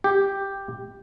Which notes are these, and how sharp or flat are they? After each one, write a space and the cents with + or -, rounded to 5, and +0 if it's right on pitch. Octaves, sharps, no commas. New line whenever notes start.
G4 +5